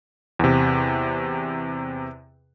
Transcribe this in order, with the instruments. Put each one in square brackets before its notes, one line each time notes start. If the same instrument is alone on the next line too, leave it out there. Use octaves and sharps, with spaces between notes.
[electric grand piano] E2 C3